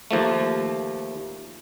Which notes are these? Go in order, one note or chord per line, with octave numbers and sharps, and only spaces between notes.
D#2 F3 A3